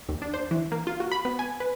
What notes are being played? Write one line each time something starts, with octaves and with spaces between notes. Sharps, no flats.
D#2
D4
C5
E3
A#3
F4
F#4
B5
B3
G#5
B4